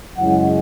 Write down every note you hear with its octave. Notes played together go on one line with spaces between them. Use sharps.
F#2 C#3 G#3 C#4 E4 F#5